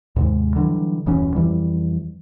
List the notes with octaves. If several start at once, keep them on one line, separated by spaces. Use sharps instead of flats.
D#2 G#2 C3 G#3
D3 E3 F#3 G3
D#1 F#2 E3 C#4
F2 E3 G3